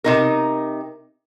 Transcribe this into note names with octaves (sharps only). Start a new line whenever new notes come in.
C3 D#4 A#4